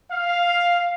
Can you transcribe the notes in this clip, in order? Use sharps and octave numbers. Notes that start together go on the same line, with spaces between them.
F5